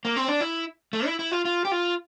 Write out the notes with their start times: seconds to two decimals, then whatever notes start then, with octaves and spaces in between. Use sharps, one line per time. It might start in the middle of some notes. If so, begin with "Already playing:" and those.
0.05 A#3
0.16 C4
0.28 D4
0.41 E4
0.93 A3
1.06 E4
1.19 E4
1.32 F4
1.45 F4
1.65 G4
1.72 F4